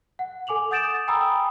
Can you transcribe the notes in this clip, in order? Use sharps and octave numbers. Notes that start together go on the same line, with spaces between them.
F#5
A4 G#5 D6 F7 F#7
F#5 D#6 G6 A6 D7 E7
G5 G#5 A#5 B5 D#6 E6